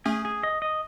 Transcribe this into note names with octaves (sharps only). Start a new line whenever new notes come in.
A3 C#4 G#4
G#4
D#5
D#5